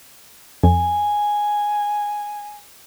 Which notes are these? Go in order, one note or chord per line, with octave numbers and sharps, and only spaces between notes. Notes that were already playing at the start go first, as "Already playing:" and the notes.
F2 G#5